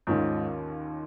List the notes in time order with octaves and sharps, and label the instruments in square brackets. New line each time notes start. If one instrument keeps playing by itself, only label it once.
[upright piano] D#2 D#3 C#4 F4 [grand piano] G#2